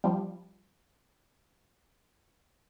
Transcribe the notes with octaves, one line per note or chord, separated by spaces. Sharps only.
F3 G3